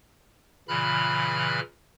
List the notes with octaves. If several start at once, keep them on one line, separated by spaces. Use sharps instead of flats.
A#2 C#3 E3 B5 F6 F#6